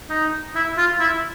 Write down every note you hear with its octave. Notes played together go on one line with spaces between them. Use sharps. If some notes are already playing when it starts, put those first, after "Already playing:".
D#4
E4
F4
E4